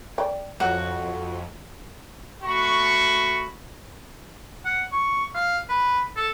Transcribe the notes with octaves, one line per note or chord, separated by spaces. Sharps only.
D5 G5
F2 F#3 F#4
A3 F#4 B5 C#6
F#5
C#6
F5
B4
A4